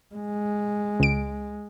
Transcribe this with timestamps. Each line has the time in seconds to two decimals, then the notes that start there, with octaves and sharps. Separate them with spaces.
0.15 G#3
1.00 C#2 D7